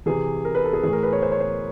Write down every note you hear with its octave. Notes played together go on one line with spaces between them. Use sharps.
C3 E3 G#4
A#4
B4
A4
G#4
A2 E3 G#4
A#4
B4
C#5
C5
C#5
C5